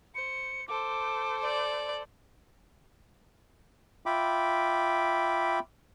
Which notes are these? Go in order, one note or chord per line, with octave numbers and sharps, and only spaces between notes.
C5 C#7
A4 C5 D6
D5
F4 E5 G5 B5 D6